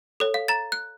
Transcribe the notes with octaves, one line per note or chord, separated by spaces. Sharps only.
A4 C#5
F5
A#5 A6
F#6